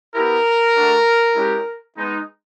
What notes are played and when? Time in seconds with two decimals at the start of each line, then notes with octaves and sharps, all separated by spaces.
0.14 B3 E4 G4 A#4
0.75 A3 D4 F#4
1.34 G#3 C#4 E4 G4
1.95 G#3 B3 D#4